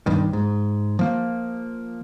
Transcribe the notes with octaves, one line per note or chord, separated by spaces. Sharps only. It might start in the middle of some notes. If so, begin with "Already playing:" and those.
B1 G2 D#3
G#2
F3 A#3